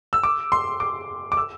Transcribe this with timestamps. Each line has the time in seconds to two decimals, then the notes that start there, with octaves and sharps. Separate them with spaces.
0.13 E6
0.23 D6
0.52 C6
0.80 D6
1.32 D6
1.37 E6